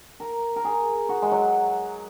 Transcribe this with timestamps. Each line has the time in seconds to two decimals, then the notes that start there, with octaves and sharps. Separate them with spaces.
0.20 A#4
0.56 A#4
0.65 G#4
1.09 F#4
1.22 G#3
1.31 F#3